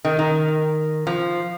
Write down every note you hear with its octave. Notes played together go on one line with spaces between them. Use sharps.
D#3
D#3
F3